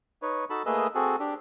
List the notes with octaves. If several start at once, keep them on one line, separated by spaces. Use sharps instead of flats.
D#4 B4 C#5
D#4 F#4 A4 A5 B5
A3 A#3 G#4 B4 D#5 E6
C4 F#4 G#4 A4
D4 G4